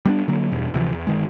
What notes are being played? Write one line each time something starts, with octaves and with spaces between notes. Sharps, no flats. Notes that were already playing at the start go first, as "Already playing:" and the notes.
G3 B3 C4 D4
D3 F#3 A#3
E2 G2 B2
D2 C3 E3 F3
E2
G1 D#3 G#3